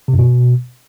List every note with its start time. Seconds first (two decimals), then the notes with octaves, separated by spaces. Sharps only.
0.08 C3
0.14 F#2
0.19 B2